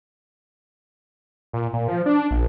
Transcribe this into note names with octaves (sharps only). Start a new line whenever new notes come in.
A#2
A#2
F3
D4
A#1